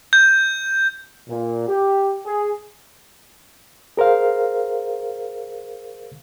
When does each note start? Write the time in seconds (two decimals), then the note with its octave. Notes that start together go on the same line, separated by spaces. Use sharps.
0.13 G6
1.29 A#2
1.67 G4
2.26 G#4
3.97 G#4 A#4 C5 F5